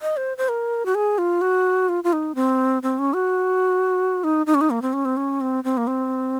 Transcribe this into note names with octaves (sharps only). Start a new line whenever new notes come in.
D#5
C5
C5
A#4
F#4
G#4
F4
F#4
F4
F4
D#4
C4
C4
C#4
F#4
D#4
D#4
C#4
D#4
A#3
C4
C#4
C4
C#4
C4
C4
A#3
C4